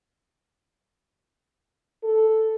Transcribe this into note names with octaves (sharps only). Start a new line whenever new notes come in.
A4